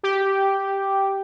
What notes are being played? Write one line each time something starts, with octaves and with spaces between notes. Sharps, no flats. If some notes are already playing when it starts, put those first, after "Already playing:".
G4